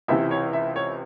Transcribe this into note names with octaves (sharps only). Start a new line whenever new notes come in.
C#2 C3 E3 E5
C#5
E5
C#5